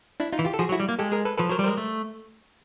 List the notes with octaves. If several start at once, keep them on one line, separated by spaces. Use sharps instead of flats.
D4 E4
D#4 F4
E3
F4 G4
A4
F3 F#4 G#4
F#3
E4 F#4
G3
A#3
G#3 G4 A4
G#4 A#4
A4 B4
F3 A4 B4
F#3 A#4 C5
G3
G#3 A#4 C5
A3